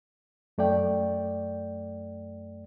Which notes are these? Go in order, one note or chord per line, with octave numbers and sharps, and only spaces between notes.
F#2 A3 D5 G5